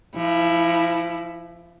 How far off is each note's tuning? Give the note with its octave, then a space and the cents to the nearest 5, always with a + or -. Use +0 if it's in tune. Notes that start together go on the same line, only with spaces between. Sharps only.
F3 -30 E4 +0